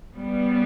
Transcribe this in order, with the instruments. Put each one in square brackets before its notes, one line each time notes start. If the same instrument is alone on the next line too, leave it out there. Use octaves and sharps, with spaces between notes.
[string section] C#3 G3 B3